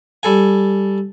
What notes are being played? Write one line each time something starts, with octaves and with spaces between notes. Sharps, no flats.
G3 A4 G#5